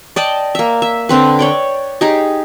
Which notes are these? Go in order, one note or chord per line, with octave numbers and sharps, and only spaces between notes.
D5 D#5 G5 A5
A#3 E5
E5
D3 C4 B4
C#5 D5 G5
D#4 G4 G#4 D#5